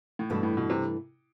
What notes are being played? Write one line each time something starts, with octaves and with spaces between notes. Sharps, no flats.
A2
G2 B2 E3 A3 D4
A2
B2
C3